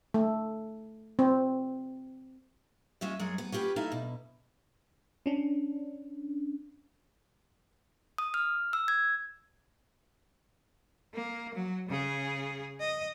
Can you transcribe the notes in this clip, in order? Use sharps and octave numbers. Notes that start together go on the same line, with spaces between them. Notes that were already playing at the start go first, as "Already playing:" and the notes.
A3
C4
G#3 C#4 F4 E5
F#2 G#3 G#4 C#5
B3
C#4 F4 G4 B4
D#4 E4 A4 F5
B2
C#4 D4
D#6
F6
E6
G#6
A#3
F#3
C#3 G#4
D#5